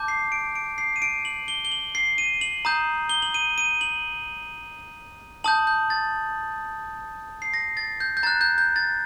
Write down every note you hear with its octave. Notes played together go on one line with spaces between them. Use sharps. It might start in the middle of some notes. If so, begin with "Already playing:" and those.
Already playing: A5 D6 G6
C7
D7
D7
C7
D#7
D7
F#7
G7
G7
F#7
C7
D#7
F#7
A#5 D#6 G6
G7
F#7
D#7
D#7
F#7
A5 D#6 G6 F#7
G6
A6
C7
A#6
A6
G6
G6
A#5 F#6 A6
G6
G6
A6